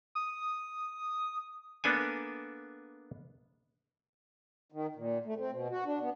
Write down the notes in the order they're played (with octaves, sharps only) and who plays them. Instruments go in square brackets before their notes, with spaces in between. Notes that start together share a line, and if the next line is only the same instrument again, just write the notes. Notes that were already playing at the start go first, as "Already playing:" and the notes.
[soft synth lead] D#6
[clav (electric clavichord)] A#3 B3 D4 A4 G#5
[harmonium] D#3
A#2
A3
C4
B2
F#4
D4
B3